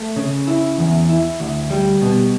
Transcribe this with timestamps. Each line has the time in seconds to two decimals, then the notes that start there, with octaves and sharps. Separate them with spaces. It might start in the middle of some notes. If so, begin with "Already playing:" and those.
Already playing: A3
0.16 C#3
0.47 E4
0.78 E2
1.09 E4
1.40 D2
1.71 G3
2.02 B2